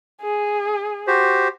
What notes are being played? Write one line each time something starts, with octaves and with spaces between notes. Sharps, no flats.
G#4
F#4 G4 C5